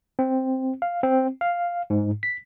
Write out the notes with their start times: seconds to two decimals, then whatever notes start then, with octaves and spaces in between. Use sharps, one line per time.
0.19 C4
0.82 F5
1.03 C4
1.41 F5
1.90 G#2
2.23 B6